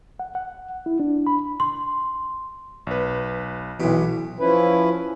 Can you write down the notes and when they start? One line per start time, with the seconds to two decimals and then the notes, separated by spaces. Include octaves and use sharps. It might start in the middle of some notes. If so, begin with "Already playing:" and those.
0.20 F#5
0.35 F#5
0.86 E4
1.00 D4
1.27 B5
1.60 C6
2.87 B1 B4
3.80 B1 B2 E3
4.40 F3 C#4 E4 B4